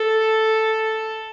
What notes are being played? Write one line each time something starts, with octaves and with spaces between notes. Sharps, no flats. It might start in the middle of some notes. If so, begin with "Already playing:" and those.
Already playing: A4